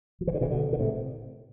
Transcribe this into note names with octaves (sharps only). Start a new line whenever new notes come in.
F3
E3
D3
C3 E3
B2 D3
D3
A2 C3